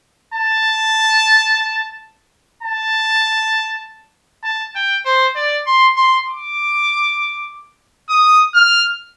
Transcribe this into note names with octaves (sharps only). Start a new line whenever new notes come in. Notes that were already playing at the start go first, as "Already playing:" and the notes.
A5
A5
A5
G5
C5
D5
C6
C6
D6
D#6
F6